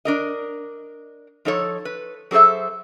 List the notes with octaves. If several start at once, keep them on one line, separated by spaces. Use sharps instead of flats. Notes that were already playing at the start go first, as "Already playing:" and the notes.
D4 A#4 D#5
F3 D#4 A4 C#5
B4
F#3 G#4 A4 C5 E5